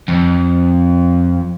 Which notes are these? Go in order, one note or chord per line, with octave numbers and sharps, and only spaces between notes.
F2